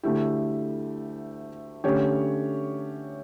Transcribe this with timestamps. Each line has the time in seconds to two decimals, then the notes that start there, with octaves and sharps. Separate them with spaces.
0.03 D2 D3 A3 E4 G4
1.84 D3 A3 C#4 G4 C#5